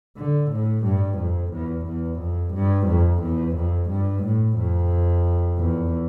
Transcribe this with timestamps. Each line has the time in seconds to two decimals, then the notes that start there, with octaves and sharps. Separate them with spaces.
0.17 D3
0.51 A2
0.84 G2
1.18 F2
1.52 E2
1.86 E2
2.19 F2
2.54 G2
2.87 F2
3.22 E2
3.56 F2
3.90 G2
4.23 A2
4.58 F2
5.59 E2